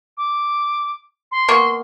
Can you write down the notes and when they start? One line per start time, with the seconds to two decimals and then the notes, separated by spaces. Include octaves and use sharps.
0.17 D6
1.32 C6
1.48 B2 A#3 C#6